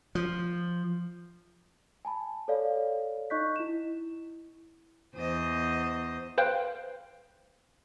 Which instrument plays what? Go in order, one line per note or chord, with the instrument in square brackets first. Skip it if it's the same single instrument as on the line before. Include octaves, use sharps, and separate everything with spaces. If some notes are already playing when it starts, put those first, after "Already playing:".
[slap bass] F3
[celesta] G#5 A5 B5
A4 C#5 D5 F5
D#4 D#5 C#6 F#6 G6 B6
E4 E7
[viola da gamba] E2 C5 D#5
[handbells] B4 C5 F5 G5